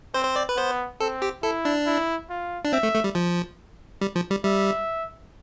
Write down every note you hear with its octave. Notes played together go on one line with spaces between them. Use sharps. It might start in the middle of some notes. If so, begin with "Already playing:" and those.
C4 C5
C5
D5
B4
B3 C5
C4 A4
G4
E4 A4
D4
E4
F4
D4
C4 E5
A3
A3
G3
F3
G3
F3
G3
G3 E5